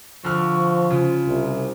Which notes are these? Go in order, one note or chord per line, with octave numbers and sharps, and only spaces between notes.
D3 F3 C#6 F6
C#3 F4
C2